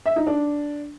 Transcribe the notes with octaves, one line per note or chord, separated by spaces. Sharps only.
E5
D#4
D4